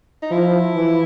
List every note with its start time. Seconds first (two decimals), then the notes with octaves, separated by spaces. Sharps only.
0.23 D#4
0.31 F3 E4
0.75 E3